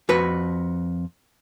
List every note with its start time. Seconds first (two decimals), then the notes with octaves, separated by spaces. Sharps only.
0.09 F2 F#4 B4